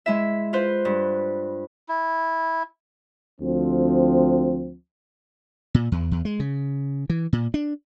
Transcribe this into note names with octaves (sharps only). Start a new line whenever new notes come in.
G#3 E4 E5
F4 B4 C5
G2
E4
D2 F3 C4
A#2
E2
E2
G#3
C#3
E3
A#2
D4